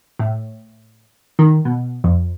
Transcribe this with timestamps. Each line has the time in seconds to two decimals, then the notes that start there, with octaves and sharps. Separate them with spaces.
0.19 A2
1.39 D#3
1.65 B2
2.04 F2